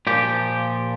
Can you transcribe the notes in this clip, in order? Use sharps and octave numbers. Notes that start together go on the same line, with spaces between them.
A#2 F3 G4